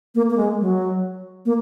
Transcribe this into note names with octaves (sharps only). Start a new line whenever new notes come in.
A#3
A#3
G#3
F#3
A#3